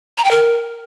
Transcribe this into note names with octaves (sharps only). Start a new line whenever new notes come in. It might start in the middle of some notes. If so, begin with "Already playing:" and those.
A#5
G5
A#4